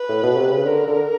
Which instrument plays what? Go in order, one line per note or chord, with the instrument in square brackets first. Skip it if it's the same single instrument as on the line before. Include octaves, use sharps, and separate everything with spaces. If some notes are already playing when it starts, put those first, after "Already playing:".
Already playing: [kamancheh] B4
[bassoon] A2
B2
C3
C#3
[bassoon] D3 [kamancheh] A#4
[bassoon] D3